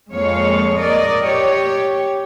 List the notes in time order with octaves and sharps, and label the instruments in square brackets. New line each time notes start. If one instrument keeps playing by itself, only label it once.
[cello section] F2 G#3 A#3 C#5 F5
A#4 D5 D#5
G4 C#5